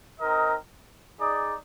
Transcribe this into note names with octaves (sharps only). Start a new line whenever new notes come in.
C4 D#4 A#4 D#5
D#4 G#4 D5